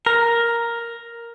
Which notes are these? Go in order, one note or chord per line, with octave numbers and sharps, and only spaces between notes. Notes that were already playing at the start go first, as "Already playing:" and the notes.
A#4